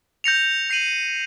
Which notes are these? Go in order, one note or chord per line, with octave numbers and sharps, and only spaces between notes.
G6 A#6 C#7 F7
G6 C7 D#7 F#7